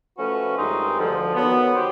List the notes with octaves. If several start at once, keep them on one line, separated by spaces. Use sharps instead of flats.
F3 A3 C#4 F#4 B4
G2 D#3 G#3 C4 D#4
D2 D3 F3
D#3 F#3 B3
G4 C5